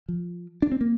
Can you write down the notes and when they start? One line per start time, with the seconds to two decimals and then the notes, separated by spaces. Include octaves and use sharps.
0.09 F3
0.62 D4
0.72 C4
0.81 A#3